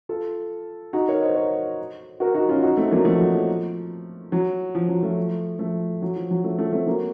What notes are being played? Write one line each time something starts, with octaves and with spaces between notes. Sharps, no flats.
F4 A4
D#4 F#4
A#4 C#5
C5 D#5
A#4 C#5
F#4 A#4
D#4 F#4
C#4 F4
D#4 F#4
A3 C4
F#3 A#3
F3 A3
F#3
F3
F#3
F3
F#3
F3 A3
F3 A3
F#3
F3
F#3
F3 A3
F3 A3
A3 C4
F#3 A#3